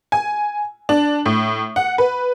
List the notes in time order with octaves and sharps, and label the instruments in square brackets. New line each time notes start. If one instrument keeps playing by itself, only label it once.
[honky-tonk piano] G#5
D4
A2
F#5
B4